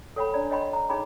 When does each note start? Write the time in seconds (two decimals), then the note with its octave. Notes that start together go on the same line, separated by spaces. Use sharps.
0.16 A4 C#5 F#5 G5 B5
0.32 D4 C#5 D5 A#5 B5
0.50 C#5 D#5 F#5 G5 B5 C6
0.73 A#5
0.89 D#4 G#4 C#5 G5 B5